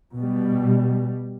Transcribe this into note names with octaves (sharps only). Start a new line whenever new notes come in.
B2 G3